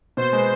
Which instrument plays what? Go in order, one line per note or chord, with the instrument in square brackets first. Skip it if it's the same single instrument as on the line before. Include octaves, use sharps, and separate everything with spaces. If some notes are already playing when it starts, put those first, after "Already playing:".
[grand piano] B2 [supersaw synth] C5
[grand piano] G#3 B3